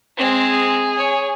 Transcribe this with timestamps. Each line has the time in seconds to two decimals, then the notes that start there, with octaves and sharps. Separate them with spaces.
0.17 G#3 C4
0.45 G#4
0.97 C#5